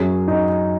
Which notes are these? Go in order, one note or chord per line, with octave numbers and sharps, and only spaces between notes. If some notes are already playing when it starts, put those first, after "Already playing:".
Already playing: F#2 F#3 G#4
D#4